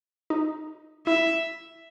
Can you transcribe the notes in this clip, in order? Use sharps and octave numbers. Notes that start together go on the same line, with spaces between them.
D#4
E4 E5